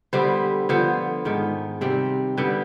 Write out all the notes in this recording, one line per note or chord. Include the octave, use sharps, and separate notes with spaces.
D3 G3 B3 C5
D3 F3 B3 C5
G#2 D#3 B3
C3 G3 C4
D3 G3 B3 B4